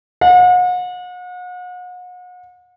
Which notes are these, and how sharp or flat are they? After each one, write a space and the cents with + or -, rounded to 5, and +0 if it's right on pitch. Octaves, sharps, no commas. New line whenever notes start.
F#5 -40